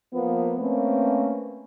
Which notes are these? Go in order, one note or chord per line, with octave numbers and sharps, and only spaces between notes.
F3 A#3 B3
A3 A#3 C4 C#4 B4